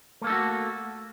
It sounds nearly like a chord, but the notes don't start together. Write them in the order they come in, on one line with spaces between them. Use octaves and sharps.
A3 A#3 A4 D#4 F#4